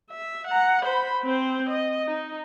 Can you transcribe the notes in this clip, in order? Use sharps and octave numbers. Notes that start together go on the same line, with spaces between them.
E5
F#5 A#5
C5 B5
C4 C5
D#5
D#4